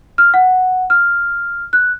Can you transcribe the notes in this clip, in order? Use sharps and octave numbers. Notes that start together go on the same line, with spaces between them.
F6
F#5
F6
F#6